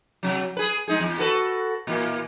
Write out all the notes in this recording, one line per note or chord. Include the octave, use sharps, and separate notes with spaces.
C3 F#3
G#4 B4
G#3 D#4 G#4
E2
F#4 A4 B4
A#2 E3 A#3